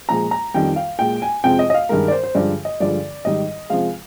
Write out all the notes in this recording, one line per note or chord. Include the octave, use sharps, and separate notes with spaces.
A#2 F3 G#3 A#5
A#5
F2 D#3 G3 G5
F5
A#2 G#3 G5
G#5
F2 C3 F3 G#3 G5
D#5
D#5
F5
G2 D#3 G#3 A#4
D5
C5
C5
G2 D3 F3 G#3 D5
D#5
G2 D3 F3 G#3 D5
G#2 D#3 G3 D#5
C3 F3 G#3 F5